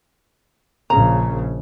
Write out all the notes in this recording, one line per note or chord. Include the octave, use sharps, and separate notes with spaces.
A#1 C#3 A#5